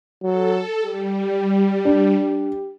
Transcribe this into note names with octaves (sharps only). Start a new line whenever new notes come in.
F#3 A4
G3 G4
D4